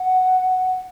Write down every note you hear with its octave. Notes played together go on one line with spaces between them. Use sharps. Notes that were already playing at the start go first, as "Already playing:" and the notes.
Already playing: F#5